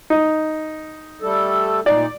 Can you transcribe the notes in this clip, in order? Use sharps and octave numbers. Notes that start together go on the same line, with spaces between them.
D#4
G3 A3 A4
A#2 D#4 D5